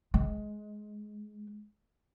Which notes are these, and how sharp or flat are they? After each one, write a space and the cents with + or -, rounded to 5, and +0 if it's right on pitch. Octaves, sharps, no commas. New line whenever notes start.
G#3 +15